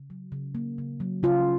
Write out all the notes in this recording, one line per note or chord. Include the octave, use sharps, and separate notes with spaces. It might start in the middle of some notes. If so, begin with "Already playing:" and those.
Already playing: C#3
F#3
C#3
A#3
C#3
F#3
C#3 F4